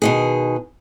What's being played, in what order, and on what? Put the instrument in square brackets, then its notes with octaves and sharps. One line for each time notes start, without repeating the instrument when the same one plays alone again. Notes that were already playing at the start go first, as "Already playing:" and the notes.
[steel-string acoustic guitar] B2 D#3 G#4